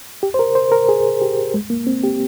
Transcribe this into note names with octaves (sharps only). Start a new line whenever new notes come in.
G4
C5
A#4
C5
A#4
G#4
G4
G#3
A#3
C4
G4